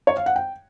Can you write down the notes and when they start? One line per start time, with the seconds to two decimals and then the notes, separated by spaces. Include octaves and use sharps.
0.07 C#5
0.17 F5
0.26 F#5
0.36 G5